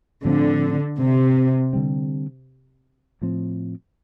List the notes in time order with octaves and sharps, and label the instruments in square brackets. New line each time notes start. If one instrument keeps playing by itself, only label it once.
[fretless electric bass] A2 F3 C4 [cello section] D3
[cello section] C3
[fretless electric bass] D3 G3 C4
A2 F3 C4